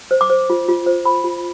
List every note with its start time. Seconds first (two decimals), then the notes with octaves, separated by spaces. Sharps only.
0.11 C5
0.21 D6
0.30 C5
0.50 F4
0.69 F4
0.86 C5
1.05 C5 B5
1.24 F4